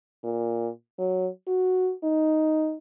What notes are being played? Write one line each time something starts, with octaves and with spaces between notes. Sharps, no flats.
A#2
F#3
F#4
D#4